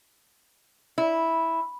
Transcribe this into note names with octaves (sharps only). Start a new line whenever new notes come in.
E4